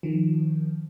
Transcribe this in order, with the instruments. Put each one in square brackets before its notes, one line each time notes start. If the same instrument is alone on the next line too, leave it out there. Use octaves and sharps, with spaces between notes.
[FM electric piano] D#3 F3